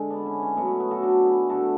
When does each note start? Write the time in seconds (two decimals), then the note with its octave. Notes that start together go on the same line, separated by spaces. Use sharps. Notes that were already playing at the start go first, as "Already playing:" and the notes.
Already playing: D3 G#3
0.10 B3 D4
0.26 C#4 E4
0.42 C#4
0.56 B2 F#3 A3 B3
0.68 C#4
0.80 B3
0.91 F#4 A4
1.03 D4 F#4
1.25 E4 G#4
1.49 D3 A3 F#4 A4